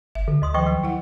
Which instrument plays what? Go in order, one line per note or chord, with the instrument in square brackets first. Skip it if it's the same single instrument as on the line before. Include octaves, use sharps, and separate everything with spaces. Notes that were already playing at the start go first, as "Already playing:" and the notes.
[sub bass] G1 [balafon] E5
[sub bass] D3 [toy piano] A4
[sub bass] D2 [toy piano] D#5 C6 D#6
[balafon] D#3 F3 [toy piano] D#5 G5 C#6
[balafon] F#3
E4 F#5